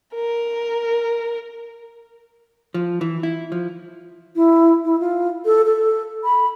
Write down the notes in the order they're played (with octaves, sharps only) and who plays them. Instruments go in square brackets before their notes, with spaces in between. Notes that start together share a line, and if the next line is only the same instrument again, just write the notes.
[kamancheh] A#4
[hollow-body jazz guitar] F3
E3
E4
F3
[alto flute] E4
E4
F4
A4
A4
B5